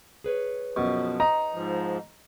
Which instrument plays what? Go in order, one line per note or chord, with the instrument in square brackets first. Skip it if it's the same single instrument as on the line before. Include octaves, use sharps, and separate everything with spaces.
[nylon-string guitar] G#4 B4 C#5
[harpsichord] F#2 B2 [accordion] F3
[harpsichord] D#4 [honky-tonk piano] A#5
[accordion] G#2 F3